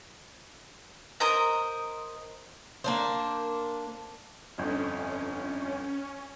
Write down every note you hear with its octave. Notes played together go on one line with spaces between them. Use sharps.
A#4 C5 D#5 A#5
A#3 D4 C5
G1 F2 C#4